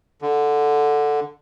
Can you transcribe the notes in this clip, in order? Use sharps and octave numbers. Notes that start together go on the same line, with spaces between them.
D3